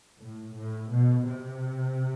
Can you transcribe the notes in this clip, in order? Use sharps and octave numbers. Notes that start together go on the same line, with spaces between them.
A2
A2
B2
C3